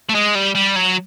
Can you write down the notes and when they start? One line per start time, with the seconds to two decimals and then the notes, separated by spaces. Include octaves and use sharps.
0.09 A3
0.15 G#3
0.35 G3
0.55 G3
0.76 F#3